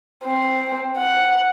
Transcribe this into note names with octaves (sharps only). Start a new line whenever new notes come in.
C4
F#5